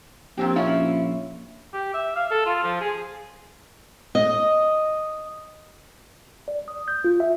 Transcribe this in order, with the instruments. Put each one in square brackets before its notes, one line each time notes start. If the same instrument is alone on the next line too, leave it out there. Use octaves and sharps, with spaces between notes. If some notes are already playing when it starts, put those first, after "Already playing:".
[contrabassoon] A#1 [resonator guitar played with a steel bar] A#2 C4 G4
[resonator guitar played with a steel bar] C#4 E4 F4
[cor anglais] G4
E5
F5
A4
F4
F3
G#4
[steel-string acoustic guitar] D#5
[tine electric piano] D5
D#6
G6
F4
E5